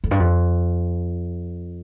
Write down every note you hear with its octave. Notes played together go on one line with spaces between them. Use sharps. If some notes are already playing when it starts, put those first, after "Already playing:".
F2
G2
F2